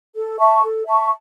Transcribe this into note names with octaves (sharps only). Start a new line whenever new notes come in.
A4
E5 A5 C#6
A4
E5 A5 C#6